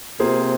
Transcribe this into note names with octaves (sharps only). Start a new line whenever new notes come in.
C3 A#3 F4 G#4 C5